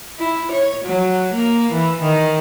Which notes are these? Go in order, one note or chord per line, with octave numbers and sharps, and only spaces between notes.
E4
C#5
F#3
A#3
E3
D#3